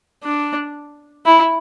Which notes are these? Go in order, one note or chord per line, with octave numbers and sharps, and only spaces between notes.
D4
E4